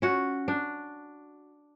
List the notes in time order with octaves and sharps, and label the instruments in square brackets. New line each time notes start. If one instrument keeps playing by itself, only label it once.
[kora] C#4 F#4
D4